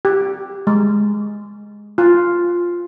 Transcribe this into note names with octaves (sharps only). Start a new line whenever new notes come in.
G4
G#3
F4